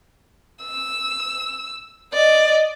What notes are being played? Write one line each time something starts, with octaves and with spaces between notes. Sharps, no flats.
E6
D5 D#5